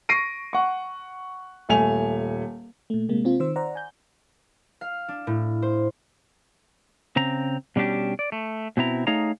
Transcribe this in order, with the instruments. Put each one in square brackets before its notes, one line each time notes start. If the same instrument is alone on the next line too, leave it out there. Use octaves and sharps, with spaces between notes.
[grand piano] C#6 A#6 C7 D7 D#7
F#5 C#6
D#1 A3 G#5 F7
[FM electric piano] A#2 A3
C3 G#3 A#3
C3 C4 F4
D#3 C5 E6
C5 D5 F#5 A#5
G#5 G6
[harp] F5
D4
A2
C5
[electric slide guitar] C#3 C4 A#5
B2 G3 C#4 D4 G4
D5
A3
B2 C4 E4 A#5
A3 D#4 G#4 C#5 F5 A#5